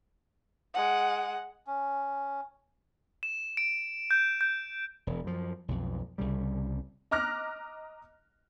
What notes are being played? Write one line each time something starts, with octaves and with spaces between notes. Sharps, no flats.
G#3 F#5
C#4
E7
D7
G6
G6
E1
F#2 F3
B1 F2
C2 C#3 G3
D#5 A#5 D6 F6 F#6 A#6